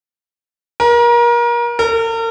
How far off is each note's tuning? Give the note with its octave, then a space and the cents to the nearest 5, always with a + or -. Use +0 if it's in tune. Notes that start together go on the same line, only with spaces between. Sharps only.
A#4 +30
A#4 -40